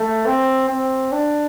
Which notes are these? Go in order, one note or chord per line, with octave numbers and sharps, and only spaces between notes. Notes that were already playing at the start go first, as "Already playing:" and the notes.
Already playing: A3
C4
C4
D4